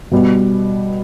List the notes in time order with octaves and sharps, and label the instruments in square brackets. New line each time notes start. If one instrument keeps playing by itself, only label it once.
[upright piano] B2 G3 B3